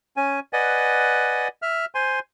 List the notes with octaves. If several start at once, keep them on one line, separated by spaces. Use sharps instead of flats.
C#4 G#5
B4 D5 D#5 F#5 G#5
E5 F6
C5 G#5 C6